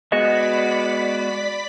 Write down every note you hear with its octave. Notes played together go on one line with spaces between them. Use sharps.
G#3 B3 F#4 D5 D#5 B5 B6